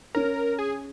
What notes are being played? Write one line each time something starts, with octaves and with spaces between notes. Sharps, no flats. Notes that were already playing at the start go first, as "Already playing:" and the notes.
C#4 A#4
G#4